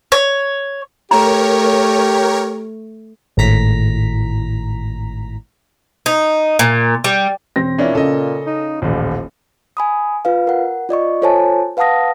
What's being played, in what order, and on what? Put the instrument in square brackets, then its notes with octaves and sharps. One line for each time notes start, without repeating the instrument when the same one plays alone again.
[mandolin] C#5
[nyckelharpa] A3 [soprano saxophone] G4 [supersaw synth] A#4 C#5 [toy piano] A#5
[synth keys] G#1 A2 A#5 B6
[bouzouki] D#4
A#2
G3
[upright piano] E1 C4 A#6
[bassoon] A#2 [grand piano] C#4 D4 E4
[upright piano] C#3 [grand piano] A4 D#5
[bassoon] D#4
[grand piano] D#1 A1 [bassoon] F3
[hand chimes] G#5 B5 D#6
F4 B4 F5
A#4 F#5
F4 D5 D#5 C#6
F4 A4 C5 C#5 G#5 A5
B4 F5 F#5 A5 D#6 A#6